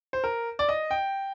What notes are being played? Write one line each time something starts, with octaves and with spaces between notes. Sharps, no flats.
C5
A#4
D5
D#5
G5